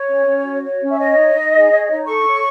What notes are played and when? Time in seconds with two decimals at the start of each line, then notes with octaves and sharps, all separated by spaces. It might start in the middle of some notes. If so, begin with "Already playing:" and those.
Already playing: C#5
0.08 C#4
0.26 C#4
0.45 F#4
0.63 C#5
0.80 C#4
0.88 E5
0.98 C#5 D#5
1.16 D#4
1.34 D#4
1.52 G#4
1.71 C#5
1.89 D#4
2.06 A4 C#6
2.25 C#5